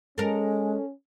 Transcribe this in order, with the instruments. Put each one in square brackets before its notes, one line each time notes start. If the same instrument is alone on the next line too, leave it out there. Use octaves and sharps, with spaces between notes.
[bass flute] G#3 [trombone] C#4 [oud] A4 A#4